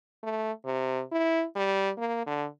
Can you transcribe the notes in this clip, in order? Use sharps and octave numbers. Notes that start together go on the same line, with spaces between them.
A3
C3
E4
G3
A#3
D3